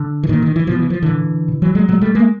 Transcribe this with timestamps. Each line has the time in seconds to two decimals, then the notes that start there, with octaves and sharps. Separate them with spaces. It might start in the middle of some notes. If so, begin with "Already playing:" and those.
Already playing: D3
0.24 E3
0.29 A#2 D#3
0.42 D#3
0.56 E3
0.67 B2 F3
0.79 E3
0.90 F3
1.02 D3 E3
1.09 A#2
1.48 B2
1.62 E3 F#3
1.75 F#3 G#3
1.88 A#2 F#3 G#3
2.01 G3 A3
2.15 G#3 A#3